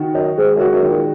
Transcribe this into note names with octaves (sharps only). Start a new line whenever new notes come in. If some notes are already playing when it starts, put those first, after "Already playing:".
Already playing: D#3 F#4
F#2 D#4
G#2 G#3
F#2
F#4
F#2
D#3
A#2